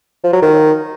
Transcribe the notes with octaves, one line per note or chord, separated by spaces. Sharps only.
F3
F#3
D#3